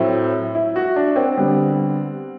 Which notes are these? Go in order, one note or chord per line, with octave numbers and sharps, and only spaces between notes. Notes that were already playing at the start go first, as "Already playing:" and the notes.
Already playing: A2 F#3 A3 C4 E4
E4
F#4
D4
C4
D3 G3 B3